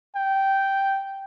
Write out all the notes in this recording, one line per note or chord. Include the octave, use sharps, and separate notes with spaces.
G5